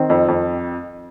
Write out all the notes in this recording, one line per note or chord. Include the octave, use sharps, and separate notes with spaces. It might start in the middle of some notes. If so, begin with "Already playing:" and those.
Already playing: D#3 C4
F2
F2